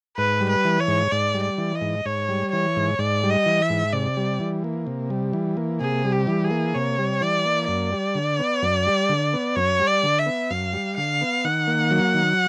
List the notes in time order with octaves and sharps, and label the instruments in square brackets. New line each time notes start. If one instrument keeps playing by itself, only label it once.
[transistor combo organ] G#2 [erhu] B4
[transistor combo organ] G3
[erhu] B4
[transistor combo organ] E3
[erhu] C#5
[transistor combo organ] G#2
[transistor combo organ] G#2 [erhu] D5
[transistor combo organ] G3
[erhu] D5
[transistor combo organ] E3
[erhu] D#5
[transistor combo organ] G#2
[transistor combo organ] G#2 [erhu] C#5
[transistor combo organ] G3
[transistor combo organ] E3 [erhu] C#5
[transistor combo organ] G#2
[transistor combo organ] G#2 [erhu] D5
[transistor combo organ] G3
[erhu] D#5
[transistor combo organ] E3
[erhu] E5
[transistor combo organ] G#2
[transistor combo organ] C3 [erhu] D5
[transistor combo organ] G3
E3
A#3
C3
G3
E3
A#3
[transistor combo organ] C3 [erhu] G#4
[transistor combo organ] G3
[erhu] G4
[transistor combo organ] E3
[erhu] G#4
[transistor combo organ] A#3
[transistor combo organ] C3 [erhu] C#5
[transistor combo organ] G3
[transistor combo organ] E3 [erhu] D5
[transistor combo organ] A#3
[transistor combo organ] F#2 [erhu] D5
[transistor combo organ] G3
D3
B3
F#2
G3
D3
B3
[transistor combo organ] F#2 [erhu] C#5
[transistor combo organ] G3
[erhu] D5
[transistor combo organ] D3
[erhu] E5
[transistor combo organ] B3
[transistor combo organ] F#2 [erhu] F5
[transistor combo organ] G3
[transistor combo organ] D3 [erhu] F5
[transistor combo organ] B3
[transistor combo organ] D#3 [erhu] F#5
[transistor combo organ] A#3
F#3
D#3